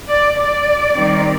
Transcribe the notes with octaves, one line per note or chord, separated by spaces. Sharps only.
D5
D5
D#3 G3 C4